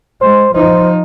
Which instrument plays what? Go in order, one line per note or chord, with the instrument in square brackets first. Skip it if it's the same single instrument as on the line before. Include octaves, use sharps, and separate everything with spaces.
[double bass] G#3 [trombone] C5
[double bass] F3 D#4 [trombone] C5